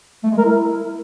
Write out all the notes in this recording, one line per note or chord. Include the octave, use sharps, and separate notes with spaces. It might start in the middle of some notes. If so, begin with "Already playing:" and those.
A3
G#3
A#4
E4